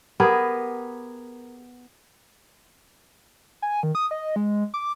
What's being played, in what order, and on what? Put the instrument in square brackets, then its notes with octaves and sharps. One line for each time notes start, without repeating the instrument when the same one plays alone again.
[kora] B3 G4 G#4 A#4
[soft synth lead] G#5
D#3
D#6
D#5
G#3
D6